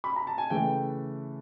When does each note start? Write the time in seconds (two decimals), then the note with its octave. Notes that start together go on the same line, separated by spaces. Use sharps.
0.04 B5
0.16 A#5
0.27 A5
0.38 G#5
0.50 C#3 E3 A3 G5